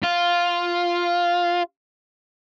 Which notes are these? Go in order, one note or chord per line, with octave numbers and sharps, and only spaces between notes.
F4